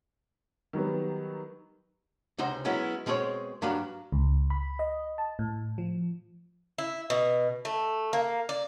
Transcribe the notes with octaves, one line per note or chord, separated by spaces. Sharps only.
D#3 F#3 G3 B3
C#2 C3 D#4 F#4 C5
F#3 G#3 B3 C#4 E4
B2 G#3 C4 G#4 C#5
G2 F#3 D4 F5 B5
C#2
B5
D#5
A5
A2
F3
E4
B2
A3
A#3
D5